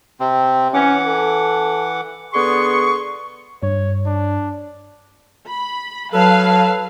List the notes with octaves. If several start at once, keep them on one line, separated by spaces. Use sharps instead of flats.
C3 C4
E3 C#4 F#5 D6
A4
D3 B3 G#4 C6 C#6
G2 C#5
D4
B5
F#3 A4 B4 F5 A5